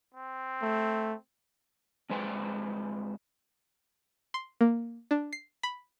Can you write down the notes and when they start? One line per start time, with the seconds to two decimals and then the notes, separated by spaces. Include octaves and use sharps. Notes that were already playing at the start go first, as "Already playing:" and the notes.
0.14 C4
0.62 A3
2.10 F2 G#3 B4 C5 G5
4.34 C6
4.61 A#3
5.11 D4
5.33 C7
5.63 B5